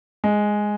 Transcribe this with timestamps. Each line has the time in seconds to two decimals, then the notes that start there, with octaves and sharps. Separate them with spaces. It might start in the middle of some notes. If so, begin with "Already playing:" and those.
0.24 G#3